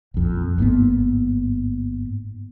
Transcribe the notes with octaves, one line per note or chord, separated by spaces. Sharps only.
A#1 F2
G1 G#2 A#3 B3